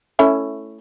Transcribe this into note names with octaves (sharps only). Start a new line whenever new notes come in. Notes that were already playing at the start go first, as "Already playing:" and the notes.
A3 C#4 E4